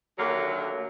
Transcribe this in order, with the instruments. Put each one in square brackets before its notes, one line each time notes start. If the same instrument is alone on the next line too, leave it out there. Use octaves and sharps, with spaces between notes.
[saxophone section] D#2 D3 F#3 A3 A#3